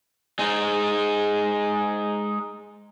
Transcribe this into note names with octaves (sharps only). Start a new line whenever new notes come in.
G#3 D#4